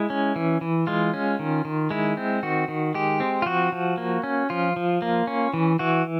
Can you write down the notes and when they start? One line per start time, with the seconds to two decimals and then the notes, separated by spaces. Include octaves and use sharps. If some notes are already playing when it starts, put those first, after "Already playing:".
Already playing: G#3 E4
0.10 C#4
0.36 E3
0.61 E3
0.87 G#3 F4
1.14 C#4
1.39 D#3
1.65 D#3
1.91 G#3 E4
2.17 C4
2.43 D#3 F#4
2.68 D#3
2.94 G#3 G4
3.20 C4
3.42 F4
3.46 F3 F#4
3.72 F3
3.98 A#3
4.23 C#4
4.50 F3 F4
4.76 F3
5.02 A#3
5.27 C#4
5.54 E3
5.79 E3 F#4